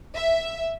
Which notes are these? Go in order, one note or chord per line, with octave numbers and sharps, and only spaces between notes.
E5